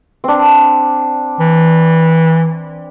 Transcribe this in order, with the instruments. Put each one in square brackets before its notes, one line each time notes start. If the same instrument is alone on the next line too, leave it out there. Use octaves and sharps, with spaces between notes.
[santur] C4 D4
[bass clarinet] E3